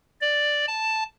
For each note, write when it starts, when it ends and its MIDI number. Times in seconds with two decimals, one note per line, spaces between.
0.21 0.66 74
0.68 1.03 81